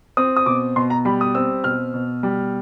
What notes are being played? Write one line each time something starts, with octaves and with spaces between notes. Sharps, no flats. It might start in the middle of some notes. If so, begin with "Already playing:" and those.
C4 D#6
D#6
B2 D6
B2 C6
A#5
G3 B5
D#6
C4 E6
B2 F6
B2
G3